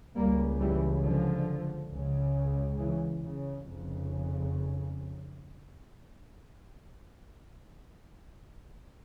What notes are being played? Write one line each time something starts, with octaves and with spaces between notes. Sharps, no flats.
C#2 C#3 G3 A#3
E3 G3
D3 F3
C#2
C#3
C#3 E3
C#3
F1 F2 C#3